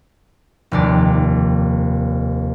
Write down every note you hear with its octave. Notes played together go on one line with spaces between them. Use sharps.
F1 D#2 D5